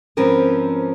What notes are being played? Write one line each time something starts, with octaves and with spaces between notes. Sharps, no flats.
G#2 F3 C4 C#4 A#4 B4